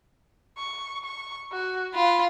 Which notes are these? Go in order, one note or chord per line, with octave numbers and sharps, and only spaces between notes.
C#6
C#6
F#4
F4 B5